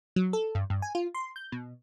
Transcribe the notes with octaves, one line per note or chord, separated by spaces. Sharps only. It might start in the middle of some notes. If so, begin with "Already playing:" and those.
F#3
A4
G2
G2
G#5
F4
C6
G6
B2